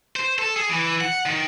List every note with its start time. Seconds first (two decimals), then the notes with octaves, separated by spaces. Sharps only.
0.16 C5
0.38 A4
0.56 G#4
0.69 E3
1.01 F#5
1.26 D#3